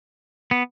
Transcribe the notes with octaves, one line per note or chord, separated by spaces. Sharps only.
B3